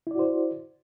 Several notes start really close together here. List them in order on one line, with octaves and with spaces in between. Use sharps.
E4 D5 F#4 C5